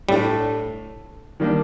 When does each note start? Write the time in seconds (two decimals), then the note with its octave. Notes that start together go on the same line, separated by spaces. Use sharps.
0.09 A2 G3 A3 D4
1.40 D#3 G3 A#3 D4